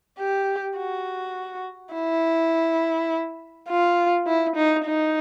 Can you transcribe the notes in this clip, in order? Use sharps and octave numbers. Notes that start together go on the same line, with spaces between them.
G4
F#4
E4
F4
E4
D#4
D#4